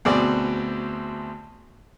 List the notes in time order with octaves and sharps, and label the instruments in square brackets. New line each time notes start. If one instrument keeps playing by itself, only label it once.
[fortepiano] D2 B2 C4 G#4 D5